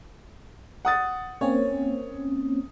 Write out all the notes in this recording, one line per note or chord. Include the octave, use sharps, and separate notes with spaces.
F#5 D#6 A6
A#3 C4 C#4 C#5